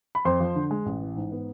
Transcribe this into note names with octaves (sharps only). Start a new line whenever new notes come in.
B5
F2 C5 C6
F3
D3
G#3
A1
E3
G#2
B3